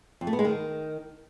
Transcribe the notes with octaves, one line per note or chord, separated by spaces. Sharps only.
F2
A3
B3
G#3
D#3